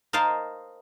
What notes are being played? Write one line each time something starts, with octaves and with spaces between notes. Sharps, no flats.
A#4 C5 D#5 F5 A5